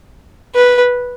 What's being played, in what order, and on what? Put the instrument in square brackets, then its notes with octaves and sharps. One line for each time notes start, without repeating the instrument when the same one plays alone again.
[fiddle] B4